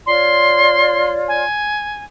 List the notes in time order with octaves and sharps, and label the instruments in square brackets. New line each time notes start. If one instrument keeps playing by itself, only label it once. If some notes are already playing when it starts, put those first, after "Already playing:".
[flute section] F4 C#5 D5 [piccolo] C6
[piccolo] G#5